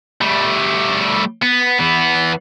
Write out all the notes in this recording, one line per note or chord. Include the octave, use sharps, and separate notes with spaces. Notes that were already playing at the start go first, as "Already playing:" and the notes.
G3 A3
B3
E3 B3